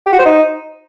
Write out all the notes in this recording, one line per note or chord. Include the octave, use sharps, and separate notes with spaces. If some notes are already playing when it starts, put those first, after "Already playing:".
G4
F#4
C5
D#4